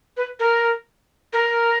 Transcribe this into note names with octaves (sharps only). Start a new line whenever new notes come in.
B4
A#4
A#4